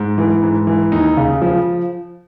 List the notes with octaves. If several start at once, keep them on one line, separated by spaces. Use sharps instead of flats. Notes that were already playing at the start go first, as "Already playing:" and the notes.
Already playing: G#2
E3
G#2
E3
D#2 D#4
C#3
F3